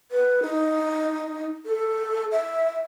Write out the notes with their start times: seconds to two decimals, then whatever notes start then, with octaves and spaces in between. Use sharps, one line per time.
0.11 B4
0.42 D#4
1.66 A4
2.32 E5